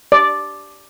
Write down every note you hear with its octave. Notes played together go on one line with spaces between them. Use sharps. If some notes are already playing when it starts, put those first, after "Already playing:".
D5